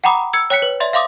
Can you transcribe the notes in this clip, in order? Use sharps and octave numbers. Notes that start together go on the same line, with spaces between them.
F#5 G5 A#5 B5 D6 D#6
E6 G#6 C#7
C#5 G5 F#6 B6 C#7
B4
D5 E5 C6 A6
E5 F5 C6 D6 D#6